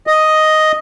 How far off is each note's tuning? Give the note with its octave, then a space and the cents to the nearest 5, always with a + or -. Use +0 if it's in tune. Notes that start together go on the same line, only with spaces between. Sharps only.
D#5 +0